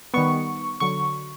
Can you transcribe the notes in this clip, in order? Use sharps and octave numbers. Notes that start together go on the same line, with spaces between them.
D#3 G3 B3 C#6
D3 F#3 C#6